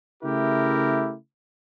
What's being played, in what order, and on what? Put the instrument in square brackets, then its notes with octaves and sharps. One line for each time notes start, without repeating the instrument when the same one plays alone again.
[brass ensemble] C#3 A3 E4 G4 A#4